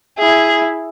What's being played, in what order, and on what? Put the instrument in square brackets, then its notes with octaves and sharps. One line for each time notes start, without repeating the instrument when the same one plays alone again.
[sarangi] E4 [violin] G#4